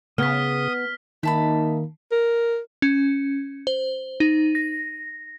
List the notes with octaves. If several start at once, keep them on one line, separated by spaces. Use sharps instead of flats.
C#3 B3 D#6 F6 B6
D#3 A#3 D#4 E5 A5 B5
A#4
C#4
C5
D#4
A#6